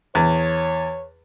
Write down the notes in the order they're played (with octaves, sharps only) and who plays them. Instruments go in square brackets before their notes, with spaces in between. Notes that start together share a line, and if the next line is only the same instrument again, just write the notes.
[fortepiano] E2 [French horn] C#5